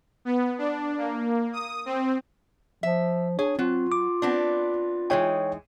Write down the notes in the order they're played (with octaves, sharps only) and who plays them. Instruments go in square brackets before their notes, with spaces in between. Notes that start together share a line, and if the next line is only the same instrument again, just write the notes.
[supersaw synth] B3
D4
A#3
D#6
C4
[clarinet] F3 [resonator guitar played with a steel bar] E5
[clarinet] D4 [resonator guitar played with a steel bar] G#4 [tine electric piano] C#5
[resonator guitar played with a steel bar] F#3 [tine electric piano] C4 [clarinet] F4
[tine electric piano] D6
[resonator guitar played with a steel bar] B3 C4 D4
[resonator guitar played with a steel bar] E3 G#3 D#4 [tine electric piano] C#5 G5